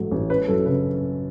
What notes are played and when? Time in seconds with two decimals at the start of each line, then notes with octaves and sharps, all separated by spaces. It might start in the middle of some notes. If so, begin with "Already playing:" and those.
Already playing: A1 G#2 F#3 A3
0.11 A1
0.30 C#4 B4
0.48 F#2 A4
0.66 C#3 B4